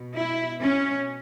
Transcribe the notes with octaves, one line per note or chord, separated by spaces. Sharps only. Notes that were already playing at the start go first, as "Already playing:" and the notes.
Already playing: B2
E4
C#4